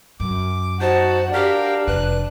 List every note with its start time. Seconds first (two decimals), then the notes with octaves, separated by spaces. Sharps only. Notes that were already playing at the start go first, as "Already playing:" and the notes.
0.20 F#2 D6
0.81 D#4 F#4 C5 A5
1.33 D4 G4 A#4 F5 G5
1.87 F1 F2 B4 F#6